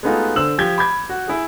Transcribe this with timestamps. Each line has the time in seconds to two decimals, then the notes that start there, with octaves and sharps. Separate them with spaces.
0.03 G#3 A3 B3 D#4 F4 F#4
0.36 D3 C5 E6 F#7
0.58 F3 G4 G#6 G7
0.78 B5 D6 G6 G#6
1.09 F#4
1.27 E4 G#4